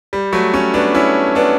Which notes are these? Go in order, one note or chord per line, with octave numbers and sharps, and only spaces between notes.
G3
F#3 A3
A3 C#4
B3 D4
C#4 E4
B3 D4